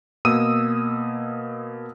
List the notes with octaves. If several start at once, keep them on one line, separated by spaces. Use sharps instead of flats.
B2 A#3 D#6 E6 D#7